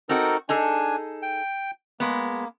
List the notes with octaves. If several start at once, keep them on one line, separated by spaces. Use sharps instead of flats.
C4 D#4 F#4 A4 A#4
D4 D#4 G#4 A4 G#5
G5
G#3 A#3 B3